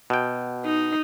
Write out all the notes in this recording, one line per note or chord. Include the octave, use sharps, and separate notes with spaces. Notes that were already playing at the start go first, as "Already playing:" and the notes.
B2 G5
D#4